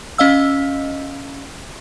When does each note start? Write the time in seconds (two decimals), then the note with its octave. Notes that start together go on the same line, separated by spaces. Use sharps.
0.18 C#4 D#5 F5 E6